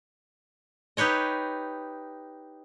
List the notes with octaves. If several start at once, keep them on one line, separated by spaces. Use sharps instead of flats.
D#4 G4 B4 C#5 D#5